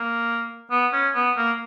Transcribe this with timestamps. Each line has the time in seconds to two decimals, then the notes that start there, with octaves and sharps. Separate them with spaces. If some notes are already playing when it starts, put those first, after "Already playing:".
Already playing: A#3
0.71 B3
0.93 C#4
1.15 B3
1.37 A#3